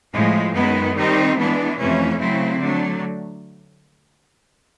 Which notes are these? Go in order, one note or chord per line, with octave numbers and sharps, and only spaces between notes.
A2 F3 G#3
F#2 D#3 G#3 B3
D#3 G3 C4 D#4
E3 G#3 B3 D4
F2 C3 E3 A3 C#4
C#3 F#3 A3 C4 E4
D3 F#3 A3 D4